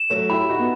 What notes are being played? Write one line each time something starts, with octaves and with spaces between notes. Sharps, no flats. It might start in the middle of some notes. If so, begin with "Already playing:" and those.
Already playing: E7
F#3 A3
E4 G4 B5
D#4 F#4
B3